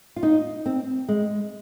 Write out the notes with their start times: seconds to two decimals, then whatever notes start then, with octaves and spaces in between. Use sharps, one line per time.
0.16 F4
0.23 D#4
0.66 C4
1.08 G#3